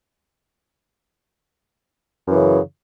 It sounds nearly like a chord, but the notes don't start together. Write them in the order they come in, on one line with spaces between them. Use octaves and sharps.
F#2 E3 C#3